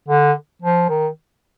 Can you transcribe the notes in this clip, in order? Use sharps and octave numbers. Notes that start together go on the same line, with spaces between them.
D3
F3
D#3